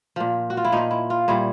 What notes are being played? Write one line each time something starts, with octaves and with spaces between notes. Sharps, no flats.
A#2 F3
F#4
F4
E4
A#2 F3 D#4
E4
F4
A#2 G3 E4